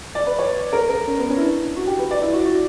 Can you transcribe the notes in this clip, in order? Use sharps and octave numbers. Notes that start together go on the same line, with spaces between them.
D5
B4
C#5
A#4
A#4
C#4
B3
C#4
E4
D4
F#4
G4
B4
D5
E4
F#4
F#4